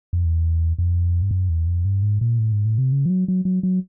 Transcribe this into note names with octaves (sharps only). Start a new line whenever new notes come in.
F2
E2
F2
G2
F#2
E2
F2
G2
G#2
A#2
A2
G#2
A2
C3
C#3
F3
F#3
F#3
F#3
F#3